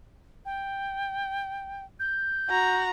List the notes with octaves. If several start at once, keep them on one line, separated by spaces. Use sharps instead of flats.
G5
G6
F#4 A#5